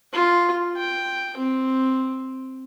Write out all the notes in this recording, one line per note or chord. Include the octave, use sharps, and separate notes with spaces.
F4
G5
C4